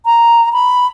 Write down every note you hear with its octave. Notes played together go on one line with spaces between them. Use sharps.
A#5
B5